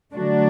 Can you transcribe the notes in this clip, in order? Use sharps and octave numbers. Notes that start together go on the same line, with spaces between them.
D3 F#3 A3 D4 F#4